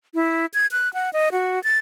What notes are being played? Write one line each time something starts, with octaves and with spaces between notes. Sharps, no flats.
E4
G#6
F#6
F#5
D#5
F#4
A6